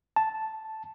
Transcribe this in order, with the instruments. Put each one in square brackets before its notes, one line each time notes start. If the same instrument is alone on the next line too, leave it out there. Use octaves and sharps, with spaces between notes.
[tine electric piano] A5